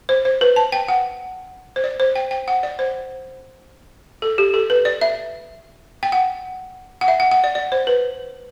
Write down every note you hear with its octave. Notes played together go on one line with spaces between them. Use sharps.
C5
C5
B4
A5
G5
F#5
C5
D5
C5
G5
G5
F#5
D5
C5
A4
G4
A4
B4
D5
E5
G5
F#5
F#5
E5
F#5
F#5
D5
D5
C5
B4